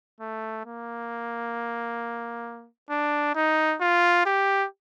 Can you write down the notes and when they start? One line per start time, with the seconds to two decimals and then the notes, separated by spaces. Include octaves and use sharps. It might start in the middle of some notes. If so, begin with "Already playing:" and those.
0.21 A3
0.66 A#3
2.90 D4
3.35 D#4
3.81 F4
4.26 G4